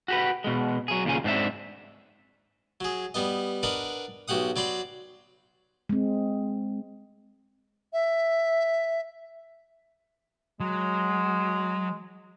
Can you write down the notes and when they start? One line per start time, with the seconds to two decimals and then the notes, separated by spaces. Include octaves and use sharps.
0.08 F#4 G4 B4
0.44 B2 G#3
0.88 F#3 G#4
1.05 D#2 A#2 C#3 G#5
1.24 G#2 C4 D4 E5
2.80 F#3 G#4
3.14 G3 B3 D#5
3.63 D4 A#4 B4 D#5 F#5
4.28 B1 F#4 G4 F#5 D#6
4.56 F#3 D5 B5 C6
5.89 G#3 C4
7.93 E5
10.60 F#3 G#3